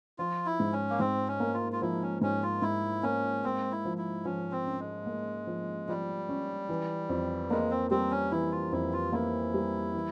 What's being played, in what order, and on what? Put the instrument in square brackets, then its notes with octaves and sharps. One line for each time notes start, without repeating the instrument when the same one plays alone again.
[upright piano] F3 [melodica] F4
[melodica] E4
[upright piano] G#2
[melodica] C#4
A#3
[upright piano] G#2 [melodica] C4
[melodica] C#4
[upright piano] A#3
[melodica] F4
F4
[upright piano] F3 [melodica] E4
[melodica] C#4
[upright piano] G#2 [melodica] C#4
[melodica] F4
[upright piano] G#2 [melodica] E4
[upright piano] A#3 [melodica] C#4
[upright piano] A#3 [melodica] C4
[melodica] E4
[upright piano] F3
[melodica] E4
[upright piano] F3 [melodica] C#4
[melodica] C4
[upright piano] C#4
[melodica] G#3
[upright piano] A#3
F3
[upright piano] F3 [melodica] G3
[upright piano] C#4
E3
F2
[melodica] G#3 [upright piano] A#3
[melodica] C4
[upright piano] G3 [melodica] C4
[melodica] C#4
[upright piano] E3 [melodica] E4
[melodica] F4
[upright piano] F2 [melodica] E4
[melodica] F4
[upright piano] A#3 [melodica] E4
[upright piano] G3
E3